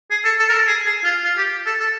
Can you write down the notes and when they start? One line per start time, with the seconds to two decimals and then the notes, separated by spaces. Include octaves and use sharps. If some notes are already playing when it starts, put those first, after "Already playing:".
0.11 G#4
0.25 A4
0.39 A4
0.49 A#4
0.53 A4
0.67 G#4
0.86 G#4
1.04 F4
1.24 F4
1.37 G4
1.66 A4
1.80 A4